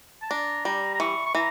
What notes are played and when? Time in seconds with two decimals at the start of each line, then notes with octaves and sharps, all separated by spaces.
0.22 A5
0.30 D4 A#5
0.65 G3 A#5
0.94 A#5
1.00 E3 C#6
1.26 C#6
1.35 E3 A#5